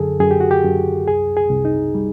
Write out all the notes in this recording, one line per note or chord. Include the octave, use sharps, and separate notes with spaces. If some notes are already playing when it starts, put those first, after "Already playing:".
Already playing: F#2 D3 G#4 A4
F#2 G#4
G4
F#4
G4
F#2
C2 G#4
G#4
C2
D#4
G3